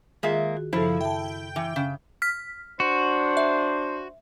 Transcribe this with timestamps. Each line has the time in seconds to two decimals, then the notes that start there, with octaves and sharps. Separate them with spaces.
0.23 D#3 G#3 A#3 F4 G#4 E5
0.57 F#4
0.73 F#2 C#3 F3 E4 A4
1.01 E5 G5 A5
1.56 E3
1.76 C#3
2.22 F6 B6
2.80 D4 F#4 C5
3.37 E5